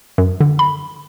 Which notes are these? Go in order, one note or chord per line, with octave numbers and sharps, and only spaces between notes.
F#2
D3
B5